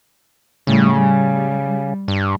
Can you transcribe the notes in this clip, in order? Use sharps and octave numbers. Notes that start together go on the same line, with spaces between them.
A2 C#3 G3
G3
G2